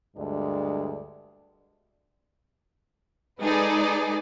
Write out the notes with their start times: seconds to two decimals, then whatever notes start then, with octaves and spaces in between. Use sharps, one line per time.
0.17 D2 G2 G#3 D4 D5
3.41 G#3 D#4 G#4 A4 B4 D5